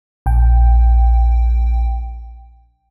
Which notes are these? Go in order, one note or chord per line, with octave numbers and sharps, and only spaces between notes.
A#1 G5